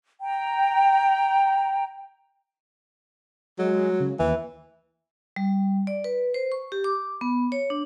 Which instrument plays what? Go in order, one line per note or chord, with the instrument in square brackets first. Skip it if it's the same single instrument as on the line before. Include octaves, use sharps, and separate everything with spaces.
[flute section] G5 A#5
[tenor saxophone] F#3 [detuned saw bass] G#3
[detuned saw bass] C#3
[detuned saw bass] D#2 [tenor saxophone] E3
[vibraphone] G3
D5
B4
C5
C#6
G4
D6
B3
C#5
D4